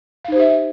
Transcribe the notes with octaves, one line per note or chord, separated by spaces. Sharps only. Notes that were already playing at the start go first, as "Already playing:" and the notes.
D#4 G4 C5 E5 F5